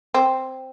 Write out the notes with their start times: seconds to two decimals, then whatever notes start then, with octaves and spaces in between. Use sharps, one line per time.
0.14 C4